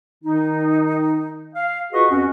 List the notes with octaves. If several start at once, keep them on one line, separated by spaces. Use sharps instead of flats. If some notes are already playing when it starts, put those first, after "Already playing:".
D#3 D#4
F5
F4 F#4 G#4 B4 D#5 C#6
F2 C#4 F#4